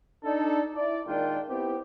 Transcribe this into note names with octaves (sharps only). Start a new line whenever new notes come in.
D4 D#4 A4
E4 D5
A#2 D#3 G#3 D4 F4 G5
B3 C4 E4 G4